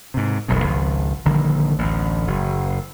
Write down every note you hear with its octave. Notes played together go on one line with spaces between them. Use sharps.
G#2 C3
E1 B1 F#2 B2
G#1 C#2 F3
A#1 D3 D#3 G3
A1 D2
F#1